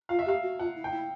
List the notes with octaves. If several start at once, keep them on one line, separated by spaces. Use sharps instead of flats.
F4 F5
E5
G4 F5
F#4
F4 F#5
E4
G5
E4